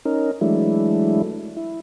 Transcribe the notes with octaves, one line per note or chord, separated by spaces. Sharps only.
C#4 D#4 A#4
E3 F#3 G#3 A3 D4 E4
E4